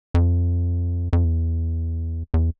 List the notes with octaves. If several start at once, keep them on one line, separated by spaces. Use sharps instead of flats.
F2
F2
E2
E2